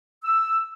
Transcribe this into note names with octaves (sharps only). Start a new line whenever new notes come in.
E6